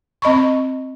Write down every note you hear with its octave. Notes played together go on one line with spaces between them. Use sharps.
C4 D#5 B5 C#6